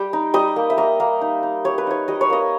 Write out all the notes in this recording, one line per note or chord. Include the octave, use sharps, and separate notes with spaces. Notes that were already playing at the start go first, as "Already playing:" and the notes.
Already playing: G3 G5
D#4
G3 D#5
A#3
E5
A#3 D#5
A#3
D#4
D#4
G3 C#5
B4
D#4 C#5
G3 D#5
C#5
A#3 D#5